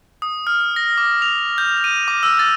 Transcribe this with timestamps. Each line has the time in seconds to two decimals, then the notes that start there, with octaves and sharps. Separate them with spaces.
0.22 D#6
0.47 F6
0.76 A#6
0.98 D6
1.22 F7
1.58 G6
1.84 D#7
2.08 D6
2.23 E6
2.39 A6